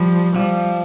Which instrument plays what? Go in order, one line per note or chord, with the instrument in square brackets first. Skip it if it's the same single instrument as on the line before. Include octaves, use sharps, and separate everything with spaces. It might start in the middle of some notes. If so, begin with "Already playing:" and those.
Already playing: [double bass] F3 [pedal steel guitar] G3
[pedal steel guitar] F3 [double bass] G3